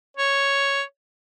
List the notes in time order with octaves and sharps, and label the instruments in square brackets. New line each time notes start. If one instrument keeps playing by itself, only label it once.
[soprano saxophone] C#5